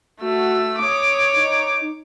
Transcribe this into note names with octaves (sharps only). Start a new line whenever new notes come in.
A3 F#4 E6
C#5 D6 D#6
D#4